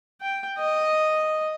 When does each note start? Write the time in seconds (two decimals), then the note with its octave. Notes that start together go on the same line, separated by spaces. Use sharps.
0.21 G5
0.58 D#5